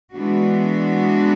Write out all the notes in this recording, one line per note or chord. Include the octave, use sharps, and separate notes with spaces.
E3 G#3 B3 D4 F#4